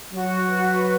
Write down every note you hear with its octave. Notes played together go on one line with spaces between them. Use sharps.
F#3 F#4
B4